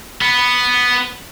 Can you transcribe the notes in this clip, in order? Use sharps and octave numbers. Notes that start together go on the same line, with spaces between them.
B3